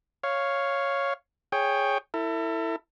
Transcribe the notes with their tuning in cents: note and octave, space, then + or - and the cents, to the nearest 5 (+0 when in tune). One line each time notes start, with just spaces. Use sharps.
C#5 +0 F5 +0
G#4 +0 C#5 +0 G5 +15
E4 +0 A4 +35